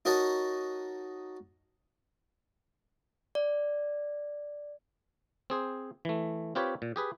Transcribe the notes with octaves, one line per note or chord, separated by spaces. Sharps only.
D#4 F#4 A#4 C#5 D#5 A5
D5
C4 G#4 C5
E3 A3
C4 F4 G4 B4 C#5
A#2
G4 G#4 B4